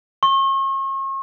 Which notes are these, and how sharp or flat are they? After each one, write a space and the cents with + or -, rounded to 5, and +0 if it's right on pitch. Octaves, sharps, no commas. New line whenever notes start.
C#6 -40